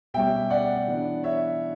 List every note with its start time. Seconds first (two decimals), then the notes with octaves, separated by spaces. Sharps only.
0.14 B2 G3 C#4 E5 G5
0.50 D5 F#5
0.87 E3 B3 D4
1.23 C#5 E5